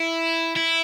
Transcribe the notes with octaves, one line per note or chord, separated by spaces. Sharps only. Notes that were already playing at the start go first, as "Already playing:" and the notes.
Already playing: E4
E4